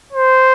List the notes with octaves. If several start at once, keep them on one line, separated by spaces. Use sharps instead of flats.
C5